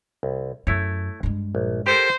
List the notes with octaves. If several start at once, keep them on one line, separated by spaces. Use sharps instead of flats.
C2
F#2 A3 E4 C#5
G2 G#3
A#1
G4 A4 A#4 C5